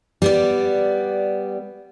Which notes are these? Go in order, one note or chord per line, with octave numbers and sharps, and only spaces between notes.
G3 B3 D5